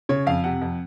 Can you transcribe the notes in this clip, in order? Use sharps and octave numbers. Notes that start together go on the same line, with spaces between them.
C#3 C#5
F2 F5
C3 F#5
F2